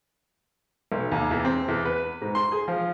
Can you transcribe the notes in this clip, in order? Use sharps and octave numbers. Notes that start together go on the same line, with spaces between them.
B1
D#2
E2
C4
E2
B4
G#2
C6
G#4
F3